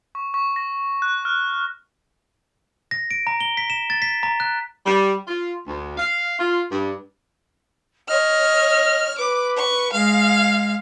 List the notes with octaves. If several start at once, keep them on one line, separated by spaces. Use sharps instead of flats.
C#6
C#6
A#6
F#6
F6
A#6
D7
A#5
G7
B6
E7
A6
B6
A#5
F#6
G3
F4
D2
F5
F4
G2
C#5 D#5 F6
B4 D6
C#6
G#3 F5